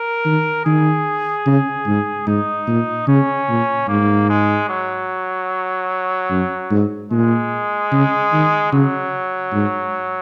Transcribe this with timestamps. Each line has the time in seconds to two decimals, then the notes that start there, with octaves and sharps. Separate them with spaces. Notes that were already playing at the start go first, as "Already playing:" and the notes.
Already playing: A#4
0.25 D#3
0.65 D#3 G#4
1.46 C#3
1.87 G#2
2.27 G#2 D#4
2.67 A#2
3.08 C#3 C#4
3.49 A#2
3.88 G#2 A#3
4.29 G#3
4.69 F#3
6.31 F#2
6.71 G#2
7.11 A#2 G#3
7.92 C#3
8.32 D#3
8.72 C#3 F#3
9.53 G#2